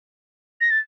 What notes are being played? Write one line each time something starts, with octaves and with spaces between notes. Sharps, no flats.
A#6
A6